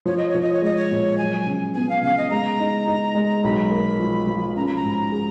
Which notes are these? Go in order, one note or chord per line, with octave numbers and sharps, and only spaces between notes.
F3 C#5
D#5
C#5
F3
D#5
C#5
G#3 D#5
C#5
A#2
F#3 G#5
C#3
B3 G#5
F5
C#3 F5
D#5
G#3 A#5
D#4
D#4
G#3
B1 B5
A#3
F3
F3
C#4 A#5
B5
A#5
G#2
G#4